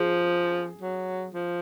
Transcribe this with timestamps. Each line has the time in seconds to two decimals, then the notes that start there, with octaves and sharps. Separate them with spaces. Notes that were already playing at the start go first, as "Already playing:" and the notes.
Already playing: F3 G#4
0.81 F#3
1.34 F3